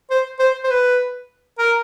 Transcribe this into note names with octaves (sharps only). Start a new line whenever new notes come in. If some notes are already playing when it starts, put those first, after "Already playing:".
C5
C5
C5
B4
A#4